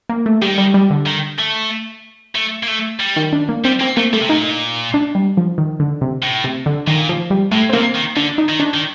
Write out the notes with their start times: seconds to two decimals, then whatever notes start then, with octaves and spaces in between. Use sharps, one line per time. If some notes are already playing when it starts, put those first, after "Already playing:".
0.09 A#3
0.26 A3
0.42 D#3 G3
0.58 G3
0.74 G3
0.90 D3
1.06 D#3
1.39 A3
2.35 A3
2.63 A#3
2.68 A3
3.00 G3
3.16 D#3
3.33 D4
3.49 A#3
3.65 G3 C4
3.80 A#3 C4
3.97 A3 A#3
4.13 G3 A3
4.21 C3
4.29 A#2 D#4
4.94 D4
5.15 G3
5.37 F3
5.58 D#3
5.80 D3
6.01 C3
6.23 A2
6.44 C3
6.66 D3
6.87 A#2 D#3
7.09 F3
7.30 G3
7.52 A2 A3
7.69 C4
7.73 C3 A#3
7.96 D#3
8.17 D3 D4
8.38 D#4
8.49 D#3
8.60 D4
8.74 D#3